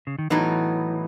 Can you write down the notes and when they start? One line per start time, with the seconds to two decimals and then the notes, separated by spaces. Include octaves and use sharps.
0.07 C#3
0.19 D#3
0.30 A2 E3 F#3 B3 D#4